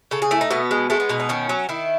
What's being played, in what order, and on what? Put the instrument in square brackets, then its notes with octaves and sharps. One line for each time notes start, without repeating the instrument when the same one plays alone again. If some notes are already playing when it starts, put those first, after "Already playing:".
[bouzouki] C#3 A4
G#4
A3 E4
D#4
B2 B3
G#3
G#3 A3
B3
B2 D#4
D#4
D#3 C#4
F#3
D#3 E4